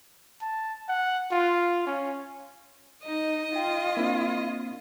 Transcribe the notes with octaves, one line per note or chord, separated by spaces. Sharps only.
A5
F#5
F4
C#4
D#4 D#5
F4 G5
A#3 C4 D4